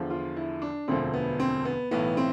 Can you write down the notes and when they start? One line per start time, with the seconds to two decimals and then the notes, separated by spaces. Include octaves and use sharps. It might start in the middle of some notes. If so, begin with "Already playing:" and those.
Already playing: E2 D3 F3
0.10 F4
0.37 E4
0.62 D4
0.88 E1 D2 D3 F3 C4
1.14 B3
1.40 C4
1.65 B3
1.91 B1 A2 E3 B3
2.17 C4